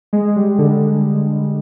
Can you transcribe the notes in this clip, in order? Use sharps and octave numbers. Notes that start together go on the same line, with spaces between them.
G#3
G3
D3